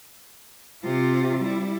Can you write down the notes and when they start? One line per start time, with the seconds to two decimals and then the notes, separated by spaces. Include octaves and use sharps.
0.84 C3 F4
1.38 G3 E4